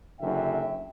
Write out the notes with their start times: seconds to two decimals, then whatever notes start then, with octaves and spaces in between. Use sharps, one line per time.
0.18 F#1 F#2 D3 E5 G5